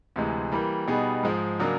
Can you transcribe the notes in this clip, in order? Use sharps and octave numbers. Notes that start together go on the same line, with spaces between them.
D2 C3 E3 G#3
E3 G3 A#3
B2 G3 B3 D#4 G#4
G#2 F3 G#3
C#3 F#3 A#3 D4